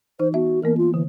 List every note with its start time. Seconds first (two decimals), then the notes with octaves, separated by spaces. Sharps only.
0.19 E3 D#4 C5
0.34 B3 F#4 E5
0.64 E3 A#3 B3 A#4
0.77 F4
0.94 D3 E3